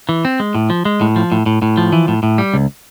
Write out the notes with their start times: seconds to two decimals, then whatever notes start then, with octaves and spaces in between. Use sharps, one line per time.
0.09 E3
0.25 C4
0.40 G#3
0.55 A2
0.70 F3
0.85 G#3
1.01 A2
1.16 F3
1.32 A2
1.46 A2
1.62 A2
1.77 F3
1.93 E3
2.08 A2
2.23 A2
2.38 G3
2.54 C#2